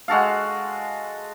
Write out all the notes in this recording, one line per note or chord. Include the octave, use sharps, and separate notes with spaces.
G#3 F#4 A4 F5